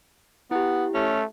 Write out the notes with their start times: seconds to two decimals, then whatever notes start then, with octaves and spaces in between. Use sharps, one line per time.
0.51 B3 E4 G4
0.94 A3 C#4